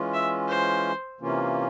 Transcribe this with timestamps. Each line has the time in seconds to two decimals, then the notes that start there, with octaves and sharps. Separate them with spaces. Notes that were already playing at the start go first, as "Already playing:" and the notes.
Already playing: E3 G#3 C#4 F4
0.14 E5
0.49 C5
1.20 C3 E3 A#3 C#4 F4